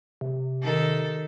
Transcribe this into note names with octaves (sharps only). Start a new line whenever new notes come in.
C3
D#3 A4